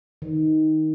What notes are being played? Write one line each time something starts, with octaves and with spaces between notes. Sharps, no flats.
D#3